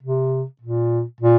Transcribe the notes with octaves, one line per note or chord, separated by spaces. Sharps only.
C3
A#2
A#2